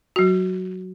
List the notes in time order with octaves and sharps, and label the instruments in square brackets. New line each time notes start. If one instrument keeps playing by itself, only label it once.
[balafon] F#3 F#4